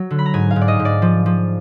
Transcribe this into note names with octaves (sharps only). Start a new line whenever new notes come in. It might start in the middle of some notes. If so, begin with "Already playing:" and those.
Already playing: F#3
D3
B5
A#5
G#2 G#5
F5
G#2
D5
D#5
G#2
D5
F3
F3